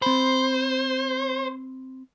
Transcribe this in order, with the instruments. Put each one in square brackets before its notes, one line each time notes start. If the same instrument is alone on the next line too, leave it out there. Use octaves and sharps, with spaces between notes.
[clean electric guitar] C4 B5 [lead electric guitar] C5